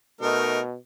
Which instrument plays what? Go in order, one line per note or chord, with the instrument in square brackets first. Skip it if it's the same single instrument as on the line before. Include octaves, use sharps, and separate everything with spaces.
[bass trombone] B2 [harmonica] A3 D#4 A#4